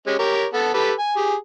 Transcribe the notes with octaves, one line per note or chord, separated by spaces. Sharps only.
G#3 C#4 G4
G4 A#4 C#5
B3 A4 A5
G4 A4 B4
G#5
G4 G#4